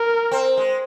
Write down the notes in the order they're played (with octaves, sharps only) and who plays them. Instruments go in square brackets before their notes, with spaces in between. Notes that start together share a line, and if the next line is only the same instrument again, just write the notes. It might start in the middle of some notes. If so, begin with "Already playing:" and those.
Already playing: [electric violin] A#4
[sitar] C4
G#3